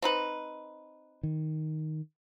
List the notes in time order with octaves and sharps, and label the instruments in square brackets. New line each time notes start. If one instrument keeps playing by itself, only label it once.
[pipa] C4 D#4 B4
[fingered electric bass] D#3